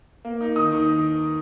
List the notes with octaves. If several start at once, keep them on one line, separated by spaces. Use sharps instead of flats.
A#3
D#4
D#3 D#6
D#3